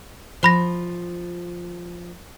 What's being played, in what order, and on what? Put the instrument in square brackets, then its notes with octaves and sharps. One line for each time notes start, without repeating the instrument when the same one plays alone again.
[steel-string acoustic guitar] F3 [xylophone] C5 B5 A#6